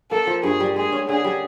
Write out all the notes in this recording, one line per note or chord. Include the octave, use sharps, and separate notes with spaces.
A#3 A4
F3
G2 G#4
G3
G#3 G#4
C#4
D3 G#4
G3